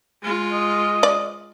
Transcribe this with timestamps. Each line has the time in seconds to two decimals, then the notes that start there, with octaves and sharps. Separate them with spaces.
0.23 G#3 F4
0.53 D#5
1.03 D5